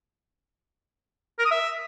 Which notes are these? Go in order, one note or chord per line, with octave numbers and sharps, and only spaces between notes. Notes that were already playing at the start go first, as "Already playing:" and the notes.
A#4
D#6
E5